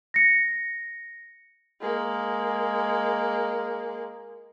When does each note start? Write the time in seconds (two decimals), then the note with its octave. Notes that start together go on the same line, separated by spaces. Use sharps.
0.14 A#6 C#7
1.81 G#3 A#3